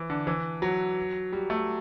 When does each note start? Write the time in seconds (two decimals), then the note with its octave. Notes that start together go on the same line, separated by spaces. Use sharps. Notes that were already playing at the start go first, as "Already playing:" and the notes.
Already playing: E3
0.10 D3
0.27 E3
0.62 F#3
1.32 G3
1.50 A3